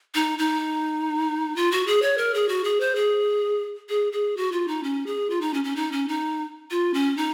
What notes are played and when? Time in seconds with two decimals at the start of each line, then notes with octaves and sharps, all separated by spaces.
0.15 D#4
0.39 D#4
1.56 F4
1.71 F#4
1.87 G#4
2.02 C#5
2.18 A#4
2.34 G#4
2.49 F#4
2.64 G#4
2.80 C5
2.95 G#4
3.89 G#4
4.12 G#4
4.37 F#4
4.52 F4
4.68 D#4
4.83 C#4
5.06 G#4
5.30 F4
5.41 D#4
5.54 C#4
5.64 C#4
5.76 D#4
5.92 C#4
6.08 D#4
6.71 F4
6.94 C#4
7.17 D#4